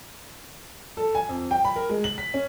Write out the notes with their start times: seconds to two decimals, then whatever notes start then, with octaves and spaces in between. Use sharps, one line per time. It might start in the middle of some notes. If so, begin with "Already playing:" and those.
0.97 A4
1.15 G#5
1.29 F2
1.51 G5
1.65 B5
1.76 A#4
1.89 G#3
2.04 F#7
2.18 B6
2.34 C#4